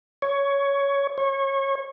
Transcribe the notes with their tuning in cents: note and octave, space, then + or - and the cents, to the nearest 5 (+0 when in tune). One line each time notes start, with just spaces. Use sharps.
C#5 +10
C#5 -25